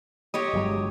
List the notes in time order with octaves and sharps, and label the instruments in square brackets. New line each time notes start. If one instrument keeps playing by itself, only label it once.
[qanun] G4 C#5 D#5
[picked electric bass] G1 F#3 G#3